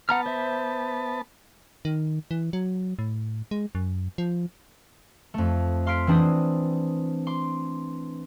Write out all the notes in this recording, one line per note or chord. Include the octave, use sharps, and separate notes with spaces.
B3 F#5 A5 A#5 F6
C5 E5
D#3
E3
F#3
A2
G#3
F#2
F3
F2 A3
F5 C6 F6 B6 C7 D7
E3 C4 D4 C5 D#6
C6 D6